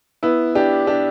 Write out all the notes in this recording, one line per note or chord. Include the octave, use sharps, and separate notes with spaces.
B3 E4
D4 G4
D4 G4